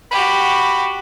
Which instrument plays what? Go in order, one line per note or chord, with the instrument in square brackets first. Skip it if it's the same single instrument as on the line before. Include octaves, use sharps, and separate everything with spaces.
[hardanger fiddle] F#4 G4 [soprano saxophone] B5